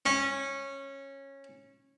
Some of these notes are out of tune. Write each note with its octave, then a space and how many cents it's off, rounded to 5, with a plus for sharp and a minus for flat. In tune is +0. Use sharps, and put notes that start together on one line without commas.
C#4 -15